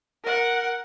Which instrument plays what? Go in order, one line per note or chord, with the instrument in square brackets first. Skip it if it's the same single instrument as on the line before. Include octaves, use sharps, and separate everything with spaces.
[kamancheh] A#4 F#5